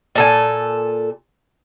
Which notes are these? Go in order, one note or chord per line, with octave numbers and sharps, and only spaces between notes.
A#2 A4 G#5